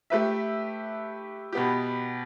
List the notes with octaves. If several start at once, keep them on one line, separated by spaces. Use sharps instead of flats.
A3 G4 B4 E5
B2 B3 G4